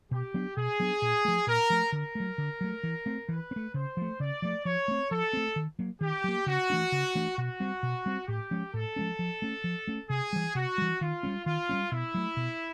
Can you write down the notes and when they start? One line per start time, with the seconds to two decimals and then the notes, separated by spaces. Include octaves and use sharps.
0.11 B2 G4
0.34 F#3 B3 D4
0.57 B2 G#4
0.80 F#3 B3 D4
1.02 A#2
1.25 F3 A3
1.47 A#2 A#4
1.70 F3 A3
1.92 D3 A#4
2.15 F#3 A3
2.38 D3
2.61 F#3 A3
2.83 E3
3.06 A3 C4
3.29 E3 B4
3.51 C4
3.56 A3
3.74 C#3 C5
3.97 F3 A3
4.20 C#3 D5
4.42 F3 A3
4.65 F3 C#5
4.88 A3 C4
5.11 F3 A4
5.33 A3 C4
5.56 D#3
5.79 F#3 A#3
6.01 D#3 G4
6.24 F#3 A#3
6.46 C#3 F#4
6.70 E3 A3 D4
6.92 C#3
7.15 E3 A3 D4
7.37 B2 F#4
7.60 G3 C4
7.83 B2
8.06 G3 C4
8.28 A2 G4
8.51 F3 G#3 C#4
8.74 A2 A4
8.96 F3 G#3 C#4
9.19 F3
9.42 A3 C#4
9.64 F3
9.87 A3 C#4
10.10 C3 G#4
10.33 E3 G3
10.55 C3 F#4
10.78 E3 G3
11.01 D#3 F4
11.23 G3 A#3 C#4
11.45 D#3 F4
11.69 G3 A#3 C#4
11.91 B2 E4
12.14 F#3 A3
12.37 B2